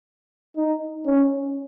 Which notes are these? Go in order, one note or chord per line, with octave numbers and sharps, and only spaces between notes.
D#4
C#4